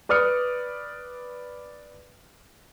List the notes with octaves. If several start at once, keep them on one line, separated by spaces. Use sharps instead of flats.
B4 D5 D#6 F6 C#7